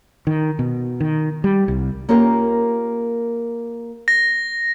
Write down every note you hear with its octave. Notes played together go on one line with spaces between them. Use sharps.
D#3
B2
D#3
G3
C2
A#3 C#4 F4 G4 A#4
A#6